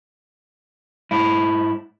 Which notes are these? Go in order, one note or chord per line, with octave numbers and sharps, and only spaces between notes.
G#2 E4